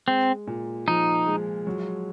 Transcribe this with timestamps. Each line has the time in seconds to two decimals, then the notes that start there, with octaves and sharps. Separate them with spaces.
0.07 G#3 C4
0.47 A#2
0.87 F3 D#4
1.26 G#3
1.67 F#3